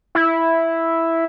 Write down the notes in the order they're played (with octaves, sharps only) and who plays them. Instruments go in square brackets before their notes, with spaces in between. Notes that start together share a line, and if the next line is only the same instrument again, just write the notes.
[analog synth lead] E4